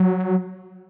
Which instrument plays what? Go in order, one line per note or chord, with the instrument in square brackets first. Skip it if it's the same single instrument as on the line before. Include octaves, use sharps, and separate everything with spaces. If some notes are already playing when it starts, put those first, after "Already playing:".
Already playing: [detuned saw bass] F#3